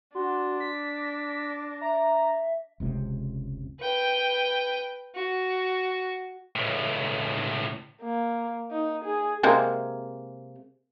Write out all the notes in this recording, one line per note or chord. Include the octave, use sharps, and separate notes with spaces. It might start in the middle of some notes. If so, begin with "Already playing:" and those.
D4 F#4 C6
B6
A#6
E5 A#5
F1 C#2 C3 G#3
B4 G5
F#4
C#2 A2
A#3
D#4
G#4
C3 G#3 A#3